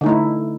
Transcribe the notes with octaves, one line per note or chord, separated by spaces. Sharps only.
D3 A3 D#4 E4